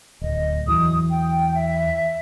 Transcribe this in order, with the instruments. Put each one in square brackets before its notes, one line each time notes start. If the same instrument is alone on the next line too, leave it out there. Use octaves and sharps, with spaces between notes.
[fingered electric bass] D1 [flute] D#5
[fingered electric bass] E2 E3 F#3 [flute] D#6
[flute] G5
E5